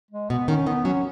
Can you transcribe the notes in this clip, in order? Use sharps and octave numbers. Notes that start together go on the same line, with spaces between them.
G#3
B2 B3
D#3 C#4
D#3 B3
F#3 C#4